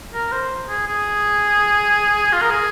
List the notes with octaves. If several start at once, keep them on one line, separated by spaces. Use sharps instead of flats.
A#4
C5
G#4
G#4
F4
A#4
G#4